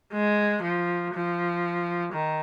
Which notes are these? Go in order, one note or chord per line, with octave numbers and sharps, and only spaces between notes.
G#3
F3
F3
D#3